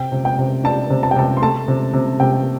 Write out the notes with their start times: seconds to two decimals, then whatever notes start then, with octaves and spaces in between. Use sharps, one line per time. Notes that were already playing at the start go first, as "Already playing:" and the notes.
Already playing: C3 G5
0.12 C3
0.25 G5
0.39 C3
0.64 D4 A5
0.90 C3
1.03 A5
1.11 G5
1.16 C3 A5
1.37 C6
1.42 A3 A5
1.68 C3
1.94 C3
2.20 C3 G5